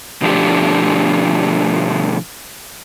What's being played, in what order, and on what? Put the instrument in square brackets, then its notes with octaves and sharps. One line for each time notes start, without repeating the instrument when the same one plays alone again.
[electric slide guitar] B2 D3 F3 A3 D4 G4